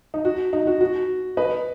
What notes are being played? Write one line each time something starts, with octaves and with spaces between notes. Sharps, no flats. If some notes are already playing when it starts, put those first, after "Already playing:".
D#4
F#4
D#4
F#4
F#4
B4 D#5